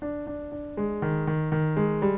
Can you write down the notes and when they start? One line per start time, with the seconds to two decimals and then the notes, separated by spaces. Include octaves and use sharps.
0.02 D4
0.27 D4
0.52 D4
0.77 G#3
1.02 D#3
1.27 D#3
1.52 D#3
1.77 G#3
2.02 G3